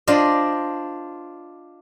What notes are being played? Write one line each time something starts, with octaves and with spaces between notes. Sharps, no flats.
D4 F4 C5 D5 D#5